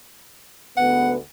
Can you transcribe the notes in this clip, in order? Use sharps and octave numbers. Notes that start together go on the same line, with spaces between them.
D2 G#2 B3 F#5